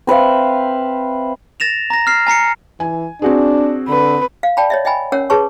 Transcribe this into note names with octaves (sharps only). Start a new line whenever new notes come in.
C4 B4 E5 F5
A6 A#6 E7 F7
A#5 A#6
F6 C7
G#5 A#5 C7 C#7
E3 G#5
C4 D4 F#4 G#4
D3 B4
F5
D5 G5 A5 B5
C#5 D#5 E5
D#5 E5 G5 G#5 B5
C#4 A#4 C#5 F#5 E6
G#4 B4 C#5 A5 C#6